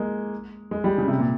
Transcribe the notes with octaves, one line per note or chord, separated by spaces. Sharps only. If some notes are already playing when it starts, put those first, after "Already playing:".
Already playing: G#3 A#3
G#3
G3
C#3
C3
A#2